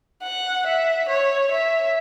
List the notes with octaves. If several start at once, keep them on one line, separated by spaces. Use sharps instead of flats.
F#5
E5
C#5
E5